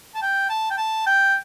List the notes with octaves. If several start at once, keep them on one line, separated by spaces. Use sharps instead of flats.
A5
G5
A5
G5
A5
G5